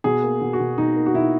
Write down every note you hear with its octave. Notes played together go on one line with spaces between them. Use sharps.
B2 G#4
A#3
B2
F#4
B2
B2 D#4
A#3
F#4
B2 E4